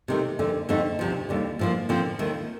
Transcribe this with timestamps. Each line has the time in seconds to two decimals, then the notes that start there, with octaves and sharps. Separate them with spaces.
0.08 C3 D#3 A3
0.39 F2 D3 A3
0.69 F2 D3 A3 C4 D#4
0.99 D2 C3 F3
1.29 D#2 D3 G3
1.59 A2 F3 A#3
1.89 D3 F3 C4
2.19 D#2 D#3 A3